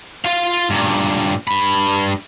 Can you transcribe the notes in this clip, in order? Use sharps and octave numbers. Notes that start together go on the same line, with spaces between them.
F4 F5
G2 A#2
G2 B5